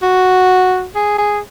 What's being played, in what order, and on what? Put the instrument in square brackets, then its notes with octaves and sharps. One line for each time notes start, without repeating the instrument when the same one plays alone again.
[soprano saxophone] F#4
G#4
G#4